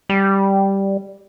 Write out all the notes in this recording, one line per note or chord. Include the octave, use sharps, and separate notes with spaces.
G3